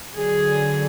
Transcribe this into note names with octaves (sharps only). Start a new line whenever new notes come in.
D3 F#3 G#4